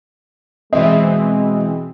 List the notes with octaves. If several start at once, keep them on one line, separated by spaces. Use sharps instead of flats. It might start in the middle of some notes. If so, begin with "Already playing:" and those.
B2 E3 G#3 C4 D#5 E5